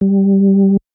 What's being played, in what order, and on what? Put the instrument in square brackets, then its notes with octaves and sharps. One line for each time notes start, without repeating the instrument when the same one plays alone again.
[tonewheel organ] G3